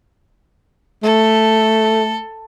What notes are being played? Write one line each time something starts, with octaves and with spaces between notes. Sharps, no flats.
A3 A4